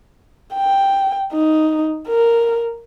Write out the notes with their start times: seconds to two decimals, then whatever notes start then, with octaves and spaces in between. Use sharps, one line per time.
0.54 G5
1.33 D#4
2.09 A#4